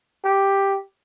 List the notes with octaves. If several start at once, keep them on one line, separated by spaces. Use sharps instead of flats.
G4